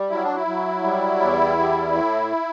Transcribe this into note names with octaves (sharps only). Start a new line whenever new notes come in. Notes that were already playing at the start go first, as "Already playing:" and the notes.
Already playing: G3
F#3 E4
D4
E4
F#3
G3
E2
G3
A2